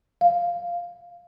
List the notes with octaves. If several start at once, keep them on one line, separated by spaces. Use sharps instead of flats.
F5